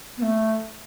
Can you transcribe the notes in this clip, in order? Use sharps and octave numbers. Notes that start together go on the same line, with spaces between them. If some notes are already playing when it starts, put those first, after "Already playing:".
B3
A3